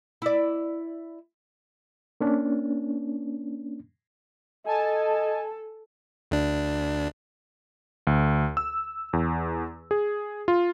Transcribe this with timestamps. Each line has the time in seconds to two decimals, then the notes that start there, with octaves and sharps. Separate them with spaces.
0.22 E4 D5
2.21 A#3 C#4 D4
4.66 A4 D#5 G#5 A5
6.31 D2 D4
8.07 D2
8.57 E6
9.13 E2
9.91 G#4
10.48 F4